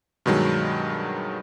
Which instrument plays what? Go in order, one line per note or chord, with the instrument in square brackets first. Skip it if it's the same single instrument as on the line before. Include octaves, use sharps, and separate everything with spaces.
[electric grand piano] G2 B2 D#3 F#3 G#3